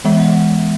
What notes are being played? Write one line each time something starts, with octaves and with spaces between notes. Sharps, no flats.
E3 G#3 B3 E5
F#5